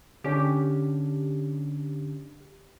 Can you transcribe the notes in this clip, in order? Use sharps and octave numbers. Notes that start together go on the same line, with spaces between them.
D3 C#4 D4 G4